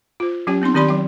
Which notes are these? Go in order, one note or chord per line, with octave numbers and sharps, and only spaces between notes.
F4 C5
F#3 C#4 G4 G5
B3 C4 D#4 C6
D#3 C4 G4 D5 B5 C6
F#3 G5